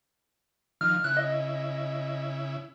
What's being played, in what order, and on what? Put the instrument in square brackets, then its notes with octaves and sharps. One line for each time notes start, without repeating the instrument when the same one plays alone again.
[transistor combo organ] D#3 F3 [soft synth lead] F6
[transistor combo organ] C#3 E4 [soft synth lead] F#6
[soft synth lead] D#5